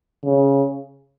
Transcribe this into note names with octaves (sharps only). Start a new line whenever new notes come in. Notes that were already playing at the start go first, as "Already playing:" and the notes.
C#3